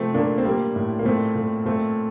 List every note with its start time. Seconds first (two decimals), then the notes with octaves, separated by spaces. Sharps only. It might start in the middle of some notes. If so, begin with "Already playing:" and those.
Already playing: C3 F3 A3 C4
0.14 A#2 A#3 D4
0.38 C4
0.45 G3 A#3
0.76 A2
0.99 A#3
1.05 A#2 A3 C4
1.35 A#2
1.65 A#2 A3 C4